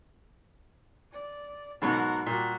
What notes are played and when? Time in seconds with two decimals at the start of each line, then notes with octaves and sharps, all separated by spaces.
1.12 D5
1.82 G#2 B2 F#3 A#4 F#5
2.26 A#2 G3 F#4